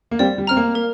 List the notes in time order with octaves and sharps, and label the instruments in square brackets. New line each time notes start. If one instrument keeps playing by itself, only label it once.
[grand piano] A#3
[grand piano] G3 C4 [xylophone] D5
[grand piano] G3
[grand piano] C4 [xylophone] A#5 F6
[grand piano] A#3
[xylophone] A#4